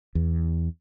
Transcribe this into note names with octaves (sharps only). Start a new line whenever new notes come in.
E2